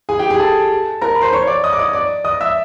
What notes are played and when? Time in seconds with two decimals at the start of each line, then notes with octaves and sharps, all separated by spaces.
0.09 G#4 G#5
0.19 G4 G5
0.30 G#4 G#5
0.40 A4 A5
1.01 A#4 A#5
1.15 B5
1.21 C5 C6
1.33 C#5 C#6
1.47 D5 D6
1.64 D#5 D#6
1.73 D6
1.78 D#5 D#6
1.93 D5 D6
2.24 D#5 D#6
2.41 E5 E6